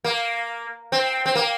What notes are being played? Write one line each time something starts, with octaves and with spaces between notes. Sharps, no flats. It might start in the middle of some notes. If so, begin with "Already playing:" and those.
A#3
C4
C4
A#3